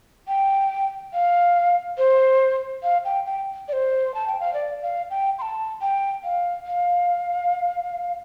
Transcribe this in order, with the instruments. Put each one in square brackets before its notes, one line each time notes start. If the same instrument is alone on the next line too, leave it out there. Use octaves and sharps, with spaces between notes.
[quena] G5
F5
C5
F5
G5
G5
D5
C5
A5
G5
F5
D5
F5
G5
C6
A5
G5
F5
F5